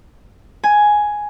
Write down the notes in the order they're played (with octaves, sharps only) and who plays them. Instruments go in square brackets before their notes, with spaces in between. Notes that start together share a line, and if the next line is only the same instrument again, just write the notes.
[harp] G#5